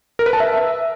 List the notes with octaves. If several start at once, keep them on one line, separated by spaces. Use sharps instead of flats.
A#4
B4
A5
E5